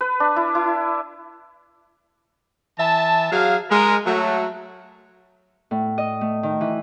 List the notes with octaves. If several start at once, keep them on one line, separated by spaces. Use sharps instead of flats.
B4
D4
E4
E4
E3 E5 A5
F#3 G#4 F5
G#3 A#4
F#3 A3
A2
D#5
A3
D#3
E3